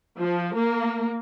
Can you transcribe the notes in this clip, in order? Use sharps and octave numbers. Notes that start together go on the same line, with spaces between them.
F3
A#3